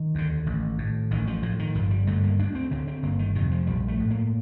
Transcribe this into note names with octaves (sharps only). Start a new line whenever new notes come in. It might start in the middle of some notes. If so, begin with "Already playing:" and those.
Already playing: D#3
D#2 D3
A1
A2
A1 D#3
F3
A2 F3
D#3
G1 F3
G3
G2 D3 A3
A#3
D2 D4
C4
D3 C4
C4
G1 A#3
D#3
F2 C3 D#3
F3
A#1 G3
A3
A2
A#3